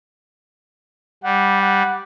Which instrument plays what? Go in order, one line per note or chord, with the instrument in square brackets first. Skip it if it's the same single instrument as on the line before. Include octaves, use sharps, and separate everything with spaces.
[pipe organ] G3 [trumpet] F#5
[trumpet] F#5